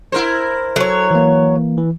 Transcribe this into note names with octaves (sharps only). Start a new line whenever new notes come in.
E4 A#4 C5
F#3 A4 C#5
E3 A#3
E3